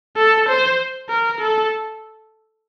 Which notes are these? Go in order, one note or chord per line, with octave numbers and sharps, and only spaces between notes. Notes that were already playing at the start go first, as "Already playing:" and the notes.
A4
C5
A#4
A4